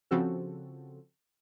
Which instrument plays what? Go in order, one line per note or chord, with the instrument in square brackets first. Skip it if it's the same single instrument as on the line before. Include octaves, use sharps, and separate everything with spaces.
[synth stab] C#3 F3 C4 F#4 A4